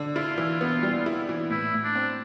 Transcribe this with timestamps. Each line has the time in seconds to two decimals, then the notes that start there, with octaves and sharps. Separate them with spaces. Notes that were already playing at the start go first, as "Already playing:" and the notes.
Already playing: D3
0.15 E4 F4
0.38 E3
0.61 B3
0.83 G3
1.06 E4
1.29 E3
1.50 A2 E4
1.74 A2
1.84 D4
1.95 C4